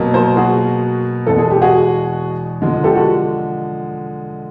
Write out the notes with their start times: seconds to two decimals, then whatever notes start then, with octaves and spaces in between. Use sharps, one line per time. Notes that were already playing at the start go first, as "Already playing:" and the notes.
Already playing: B2 F#3 A#3
0.14 A#4 C5
0.36 F#4 G#4
1.26 E2 B2 G#3 A4
1.38 G#4
1.50 G4
1.62 F#4 G#4
2.62 D3 F3 G#3
2.84 G4 A4
2.95 F#4